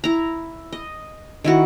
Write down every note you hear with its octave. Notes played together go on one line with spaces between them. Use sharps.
E4 A#5
D#5
D#3 E4 F#4